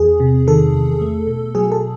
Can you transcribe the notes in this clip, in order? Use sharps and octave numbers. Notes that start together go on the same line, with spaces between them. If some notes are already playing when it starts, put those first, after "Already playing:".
Already playing: E2 G#4
C3
D#3 A4
E2
A3
B2
F#3 G#4
A4